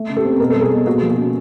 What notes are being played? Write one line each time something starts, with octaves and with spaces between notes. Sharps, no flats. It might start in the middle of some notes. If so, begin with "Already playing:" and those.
Already playing: A3
C#3
G4 A4
C4
B2 A#4
A4
G3
G#4 A#4
B2
A#3 F#4 G#4
F3
F#4
C#4